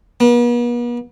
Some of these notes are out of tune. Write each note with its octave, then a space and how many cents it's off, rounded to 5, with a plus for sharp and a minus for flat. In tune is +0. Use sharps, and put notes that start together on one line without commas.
B3 -45